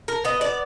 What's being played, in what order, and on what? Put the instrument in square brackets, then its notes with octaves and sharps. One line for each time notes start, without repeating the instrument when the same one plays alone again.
[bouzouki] A#4
B3 D#5
D5